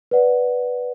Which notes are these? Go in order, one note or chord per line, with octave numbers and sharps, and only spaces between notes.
B4 D5 F#5